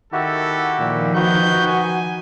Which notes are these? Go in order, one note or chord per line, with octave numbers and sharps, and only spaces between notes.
D#3 E4 F#4 G4 A4
A#2 D#3 F3
D#4 F#4 B4 C#6 G6
G#5